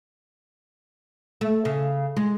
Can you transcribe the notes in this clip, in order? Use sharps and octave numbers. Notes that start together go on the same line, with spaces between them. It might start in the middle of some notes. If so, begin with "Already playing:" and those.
A3
C#3
G#3